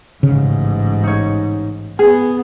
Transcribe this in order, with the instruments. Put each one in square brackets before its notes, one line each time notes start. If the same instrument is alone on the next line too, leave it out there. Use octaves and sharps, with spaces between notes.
[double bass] A1 G#2 [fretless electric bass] C#3
[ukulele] D#4 C#5
[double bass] B3 [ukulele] G#4